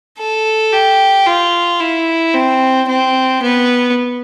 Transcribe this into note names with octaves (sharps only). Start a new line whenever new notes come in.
A4
G4
F4
E4
C4
C4
B3